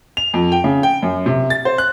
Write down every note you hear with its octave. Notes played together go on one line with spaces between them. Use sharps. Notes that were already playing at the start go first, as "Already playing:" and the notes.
F7
F2
G5
C#3
G5
F#2
C3
A6
C5
F#6